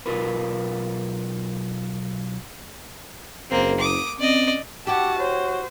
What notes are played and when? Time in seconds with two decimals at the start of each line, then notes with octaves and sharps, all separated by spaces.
0.06 B1 F4 A#4 B4
3.51 F#1 A#3 C4
3.80 D6 D#6
4.19 C4 C#4 D5 D#5
4.87 E4 F#4 G4 F#5 A5 D6
5.19 C5 C#5